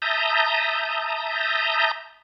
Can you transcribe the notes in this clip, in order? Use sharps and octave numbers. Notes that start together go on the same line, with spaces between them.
E5 A5 A#5 D#6 G6